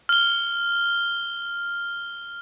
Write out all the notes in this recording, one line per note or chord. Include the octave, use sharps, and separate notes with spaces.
F6 G7